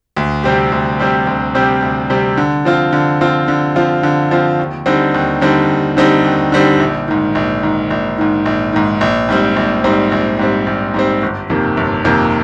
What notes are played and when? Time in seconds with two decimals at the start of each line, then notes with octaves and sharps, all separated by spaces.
0.16 D2
0.44 C3 G3 C4 G4
0.72 D2
0.99 C3 G3 C4 G4
1.27 D2
1.55 C3 G3 C4 G4
1.82 D2
2.10 C3 G3 C4 G4
2.37 D3
2.65 F3 C4 F4
2.93 D3
3.21 F3 C4 F4
3.48 D3
3.76 F3 C4 F4
4.03 D3
4.31 F3 C4 F4
4.59 D#2
4.86 D3 G3 C4 D#4
5.14 D#2
5.41 D3 G3 C4 D#4
5.69 D#2
5.97 D3 G3 C4 D#4
6.24 D#2
6.52 D3 G3 C4 D#4
6.80 A#1
7.08 G#2 D#3
7.35 A#1
7.63 G#2 D#3
7.90 A#1
8.18 G#2 D#3
8.46 A#1
8.73 G#2 D#3
9.01 A#1
9.29 G#2 G3 C4
9.56 A#1
9.84 G#2 G3 C4
10.12 A#1
10.39 G#2 G3 C4
10.67 A#1
10.94 G#2 G3 C4
11.22 G1
11.50 F2 C3 D#3 A#3
11.77 G1
12.05 F2 C3 D#3 A#3